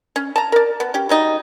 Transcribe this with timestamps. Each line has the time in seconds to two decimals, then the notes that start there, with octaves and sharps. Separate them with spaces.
0.16 C#4
0.36 A5 A#5
0.52 A#4 D5
0.80 B3
0.94 C#4 G4
1.09 F#3 G3 D#4